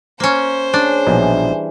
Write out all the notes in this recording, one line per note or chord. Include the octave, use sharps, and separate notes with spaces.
A#3 C#4 C5
C#3 D4
A#1 B2 E3 G3 D#4